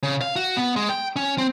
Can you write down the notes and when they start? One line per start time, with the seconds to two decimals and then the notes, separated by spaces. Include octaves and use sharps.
0.03 C#3
0.21 F5
0.36 F#4
0.57 B3
0.76 G#3
0.89 G5
1.16 C#4
1.38 C4